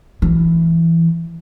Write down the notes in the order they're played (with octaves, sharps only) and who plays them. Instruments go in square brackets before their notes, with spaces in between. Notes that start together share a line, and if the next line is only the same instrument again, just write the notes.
[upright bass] E3